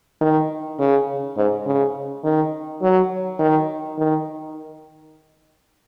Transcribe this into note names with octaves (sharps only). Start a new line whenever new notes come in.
D#3
C#3
G#2
C#3
D#3
F#3
D#3
D#3